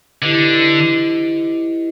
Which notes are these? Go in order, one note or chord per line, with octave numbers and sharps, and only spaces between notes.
D3 E4 G4 B4 D#5